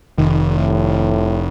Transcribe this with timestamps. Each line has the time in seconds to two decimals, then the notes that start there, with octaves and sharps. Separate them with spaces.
0.18 F1 D#3
0.57 A2